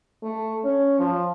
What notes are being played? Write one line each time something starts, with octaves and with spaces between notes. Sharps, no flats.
A3
C#4
F3